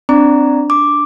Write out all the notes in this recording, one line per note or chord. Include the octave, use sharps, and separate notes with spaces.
C4 D4 D5 A#5
D6